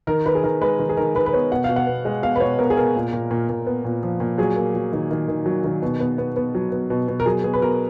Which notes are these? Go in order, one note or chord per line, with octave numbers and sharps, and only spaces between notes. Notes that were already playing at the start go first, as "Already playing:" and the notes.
D#3 A#4
D#3 B4
G#4
D#3 A#4
G#3 B4
D#3
G#4
D#3 A#4
D#3 B4
B4
B3 C#5
B2 F#5
B2 F5
F#5
B3
G#3
B2 F5
B4
B2 C#5
B3 A#4
G#4
B3 A#4
A#2
A#2
A#2
A#2
B3
A#2
F3
A#2
F#3 G#4
A#3
F#3
D#3
D#3
D#3
F#3
D#3
B2
B3
B3
B3
F#3
B3
B2
B2
A#4
F#3 G#4
B2 G#4
B4
B2 A#4